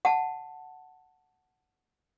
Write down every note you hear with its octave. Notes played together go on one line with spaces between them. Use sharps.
F#5 A5